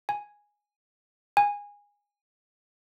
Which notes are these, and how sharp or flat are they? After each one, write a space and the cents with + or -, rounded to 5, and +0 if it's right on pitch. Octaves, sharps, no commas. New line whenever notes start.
G#5 -5
G#5 -20